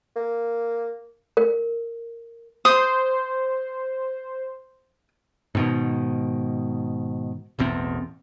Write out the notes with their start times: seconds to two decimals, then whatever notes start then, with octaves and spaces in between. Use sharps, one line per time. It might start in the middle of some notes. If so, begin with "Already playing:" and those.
0.16 A#3
1.37 A#4
2.65 C5 D#6
5.55 G#2 B2 D#3
7.59 E1 A1 E2 C4